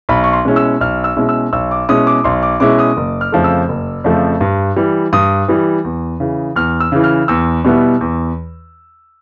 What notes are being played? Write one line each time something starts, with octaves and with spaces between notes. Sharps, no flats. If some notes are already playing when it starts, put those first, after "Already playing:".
B1 B5
C#6
C6
B2 G#3 C#4 E4
E6
B1 F6
E6
B2 G#3 C#4 E4
E6
B1 E6
D6
B2 G#3 C#4 E4 D#6
D6
B1 C6
D6
B2 G#3 C#4 E4 D6
D#6
F#1
F6
F2 C#3 F3 A3
E6
F#1
F2 C#3 F3 A3
G2
E3 G3
G2 D#6
E3 G3
E2
C#3 E3
E2 F6
E6
C#3 E3
F6
E2 E6
B2 G3 B3 E4
E2